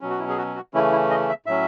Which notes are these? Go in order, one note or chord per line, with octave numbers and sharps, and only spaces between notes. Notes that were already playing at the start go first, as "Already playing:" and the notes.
B2 F#3 C#4
F#4
E4
G#4
F#4
F#4
C#3 E3 A3 C#4 E4
E4
D#5
E5
A2 F#3 C#4 E5